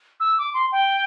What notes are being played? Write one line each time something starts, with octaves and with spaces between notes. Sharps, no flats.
E6
D6
C6
G5